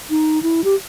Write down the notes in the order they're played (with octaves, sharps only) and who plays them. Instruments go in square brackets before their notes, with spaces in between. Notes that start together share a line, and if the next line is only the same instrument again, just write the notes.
[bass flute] D#4
E4
G4